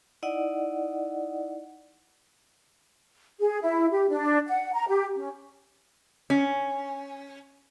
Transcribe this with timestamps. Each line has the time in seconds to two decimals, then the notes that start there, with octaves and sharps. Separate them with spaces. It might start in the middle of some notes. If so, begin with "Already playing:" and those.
0.23 D#4 E4 D5 D#5 F#5
3.40 G#4
3.63 E4
3.92 G4
4.09 D4
4.47 F#5
4.73 A#5
4.88 G4
5.16 C#4
6.30 C#4